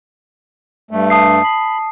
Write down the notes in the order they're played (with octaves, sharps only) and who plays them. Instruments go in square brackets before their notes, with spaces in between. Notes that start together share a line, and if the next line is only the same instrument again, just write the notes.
[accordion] G2 A3
[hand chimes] A5 D#6 C7
[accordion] B5